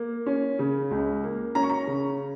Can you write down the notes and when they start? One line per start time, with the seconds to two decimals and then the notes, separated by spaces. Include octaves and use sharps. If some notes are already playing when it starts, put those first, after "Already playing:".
Already playing: A#3
0.26 C#4
0.59 C#3
0.91 C#2
1.24 A#3
1.55 C#4 A#5
1.63 C#6
1.70 A#5
1.87 C#3